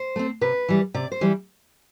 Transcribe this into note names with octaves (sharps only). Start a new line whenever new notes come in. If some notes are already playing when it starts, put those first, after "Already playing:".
Already playing: C5
A3 C4
C3 B4
E3 G3
C3 D5
C5
E3 G3